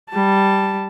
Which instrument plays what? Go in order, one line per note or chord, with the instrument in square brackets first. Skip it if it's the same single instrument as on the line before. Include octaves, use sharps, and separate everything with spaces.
[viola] G3 A5